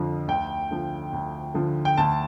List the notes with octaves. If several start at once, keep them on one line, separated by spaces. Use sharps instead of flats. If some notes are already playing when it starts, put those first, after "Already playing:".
Already playing: F2 D3 F3
D2 G5
D3 F3
D2
D3 F3
G5
D2 A5